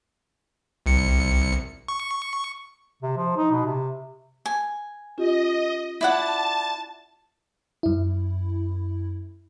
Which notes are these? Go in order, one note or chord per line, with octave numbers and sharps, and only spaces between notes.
C2 C#7
C#6
C3
F3
D#4
B2
C3
G#5
C#4 F4 G4 D#5
E4 D5 F#5 A5 A6
F#2 E4